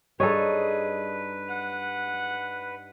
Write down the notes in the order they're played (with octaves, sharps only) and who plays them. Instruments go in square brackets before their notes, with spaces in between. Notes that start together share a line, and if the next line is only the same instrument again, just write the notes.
[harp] G2 D#4 D#5 [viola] G#4 [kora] A4 C#5 [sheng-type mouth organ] B4
[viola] F#5